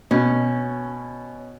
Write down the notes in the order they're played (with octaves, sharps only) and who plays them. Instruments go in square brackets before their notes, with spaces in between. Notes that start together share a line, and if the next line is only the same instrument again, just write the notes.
[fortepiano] B2 [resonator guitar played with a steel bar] C#4